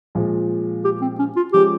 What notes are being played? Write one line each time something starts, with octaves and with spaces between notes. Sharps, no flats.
A#2 F3 G#3
G4
C4
C#4
F4
F3 G#3 C#4 F4 G4